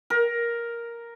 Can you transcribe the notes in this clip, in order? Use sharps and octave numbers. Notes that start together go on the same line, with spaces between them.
A#4